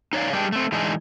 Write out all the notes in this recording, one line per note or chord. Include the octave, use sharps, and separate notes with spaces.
D#4 C#5 D5 F5
G3 G#3 D4 G4
A3 C4
E3 G#3 D4 D#4